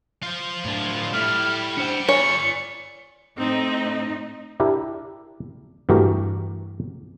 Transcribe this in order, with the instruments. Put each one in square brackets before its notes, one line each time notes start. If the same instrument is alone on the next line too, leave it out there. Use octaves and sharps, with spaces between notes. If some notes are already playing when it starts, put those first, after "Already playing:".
[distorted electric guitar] F4 C5
[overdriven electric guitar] A2 D4
[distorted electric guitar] G3 [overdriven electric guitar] A3 E4 [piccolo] F6
[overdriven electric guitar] D4 C5 [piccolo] C#7
[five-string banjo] C#5 [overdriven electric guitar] D5 G#5 [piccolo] C#7
[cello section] A2 D#4 [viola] C4
[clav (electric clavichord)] D4 E4 G4 A#4
G2 E3 A3 F#4 G4 A#4